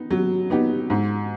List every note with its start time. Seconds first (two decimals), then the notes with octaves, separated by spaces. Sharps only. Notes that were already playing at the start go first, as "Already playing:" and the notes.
Already playing: B3 D#4
0.11 F#3
0.50 B3 D#4 G4
0.90 G#2